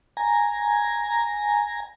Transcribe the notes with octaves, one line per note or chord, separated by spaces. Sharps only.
G#5 A#5